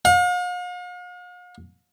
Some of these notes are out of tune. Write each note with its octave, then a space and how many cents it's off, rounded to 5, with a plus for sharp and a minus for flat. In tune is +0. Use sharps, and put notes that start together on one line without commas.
F5 +45